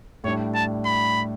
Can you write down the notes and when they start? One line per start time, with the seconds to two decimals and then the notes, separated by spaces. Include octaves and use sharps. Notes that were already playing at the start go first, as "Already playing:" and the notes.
0.24 A2 G3 D4 C#5
0.55 A5
0.85 B5